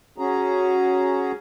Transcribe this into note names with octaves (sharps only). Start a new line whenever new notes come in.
C#4 F#4 G#4 A#5